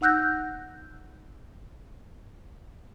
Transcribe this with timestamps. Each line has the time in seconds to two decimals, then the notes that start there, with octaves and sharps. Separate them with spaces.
0.01 D#4 F#5 E6 F#6 G6 A#6